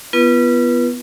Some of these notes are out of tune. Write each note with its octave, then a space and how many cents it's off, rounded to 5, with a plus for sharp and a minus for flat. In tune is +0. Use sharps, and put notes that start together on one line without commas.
B3 +0 F4 -35 B4 -25